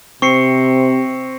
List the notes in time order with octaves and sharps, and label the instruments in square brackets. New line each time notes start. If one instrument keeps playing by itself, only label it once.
[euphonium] C3 [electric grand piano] C4 [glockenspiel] C#6 C7 C#7